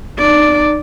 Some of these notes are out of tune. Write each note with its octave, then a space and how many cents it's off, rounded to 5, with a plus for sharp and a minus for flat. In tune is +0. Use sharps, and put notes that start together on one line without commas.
D#4 -40 D5 -5